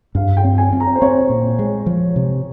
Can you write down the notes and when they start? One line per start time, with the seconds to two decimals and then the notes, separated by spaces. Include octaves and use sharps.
0.15 G2 F5
0.37 G5
0.45 C4
0.58 G#5
0.73 C4
0.80 A#5
0.95 C5
1.01 C4 C#5
1.30 A#2
1.59 G#3
1.86 F3
2.16 C3